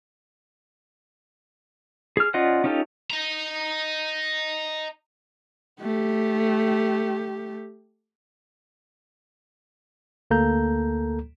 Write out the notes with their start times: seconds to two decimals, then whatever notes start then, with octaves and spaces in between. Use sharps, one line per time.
2.17 G#4 F6
2.34 C#4 F4 D5 D#5 F#5
2.64 C#4 D#4 F4 G4 A4
3.10 D#5 A#5
5.81 A3 G4
10.31 D2 A#3 A4 A#5 G6